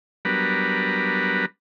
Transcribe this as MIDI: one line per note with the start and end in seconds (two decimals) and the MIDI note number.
0.25 1.46 54
0.25 1.46 55
0.25 1.46 59
0.25 1.46 62
0.25 1.46 70
0.25 1.46 71